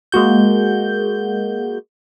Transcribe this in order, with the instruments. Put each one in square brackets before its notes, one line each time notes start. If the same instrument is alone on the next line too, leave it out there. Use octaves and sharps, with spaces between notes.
[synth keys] G#3 A#3 F#4 G6